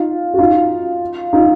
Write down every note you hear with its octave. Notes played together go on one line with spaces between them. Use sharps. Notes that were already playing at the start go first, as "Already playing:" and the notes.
Already playing: D#4 F4
F#4
D#4 F4
D#4 F4